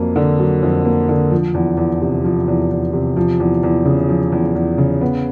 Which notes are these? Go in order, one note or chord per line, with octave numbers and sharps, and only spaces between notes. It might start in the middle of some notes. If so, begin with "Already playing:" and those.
Already playing: F2 F#3 A#3
D3
F#3
F2
A#3
D3
F3
E2
E2
C3
F3
E2
E2
C3
F3
E2
E2
C#3
F3
E2
E2
C#3
B3